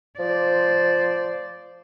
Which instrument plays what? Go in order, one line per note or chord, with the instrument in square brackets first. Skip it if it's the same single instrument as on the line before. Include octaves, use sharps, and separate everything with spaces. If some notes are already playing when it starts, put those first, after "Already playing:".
[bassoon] F3 [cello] C5 D5